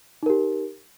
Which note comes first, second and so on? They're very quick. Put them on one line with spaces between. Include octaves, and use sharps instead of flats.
D#4 A#4 G4